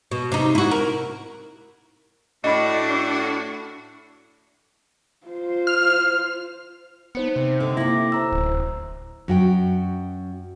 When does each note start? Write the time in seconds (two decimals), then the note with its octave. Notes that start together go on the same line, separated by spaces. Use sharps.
0.11 B2
0.32 C3 D#4
0.55 E4 F#4
0.71 A#4
2.44 A2 D4 F#4 D#5 B5
5.27 F4 C5
5.67 F6
7.15 B3 D#4 C5 C#7
7.36 C3
7.60 D3 D#4
7.77 A#3 E4 D6 A#6
8.12 C5 A#5 E6
8.32 D1
9.28 F#2 F#4 G5